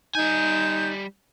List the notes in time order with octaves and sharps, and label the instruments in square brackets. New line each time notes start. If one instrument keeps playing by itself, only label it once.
[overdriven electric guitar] G3 G#5 [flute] D#4 [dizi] G6